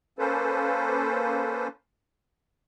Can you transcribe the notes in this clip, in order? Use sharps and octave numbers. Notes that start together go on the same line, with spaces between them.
A#3 C#4 A4 B4 C5